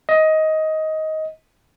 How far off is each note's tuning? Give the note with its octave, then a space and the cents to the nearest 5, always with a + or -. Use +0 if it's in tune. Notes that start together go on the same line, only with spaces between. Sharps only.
D#5 +15